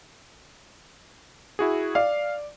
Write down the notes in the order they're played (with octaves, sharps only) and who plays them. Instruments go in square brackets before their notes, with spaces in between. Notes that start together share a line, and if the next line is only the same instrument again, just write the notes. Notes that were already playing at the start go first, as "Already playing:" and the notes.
[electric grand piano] E4 F#4 G#4
[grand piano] D5 [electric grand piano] F5